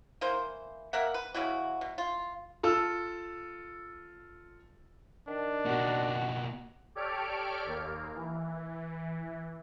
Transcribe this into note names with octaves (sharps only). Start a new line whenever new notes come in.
E3 A#3 C5
A#3 A#4 E5 F#5
B4
C#3 E3 E4 F#4
B2
F4
F4 A4 E6
D#3 D4
B2 A#3 F#4
G4 A4 C#5 D5 F6 D7
D#2 A#3
E3